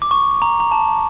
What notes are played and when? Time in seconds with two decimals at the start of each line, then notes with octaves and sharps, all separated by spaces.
0.02 D6
0.11 C#6
0.42 A#5
0.60 A#5
0.71 A5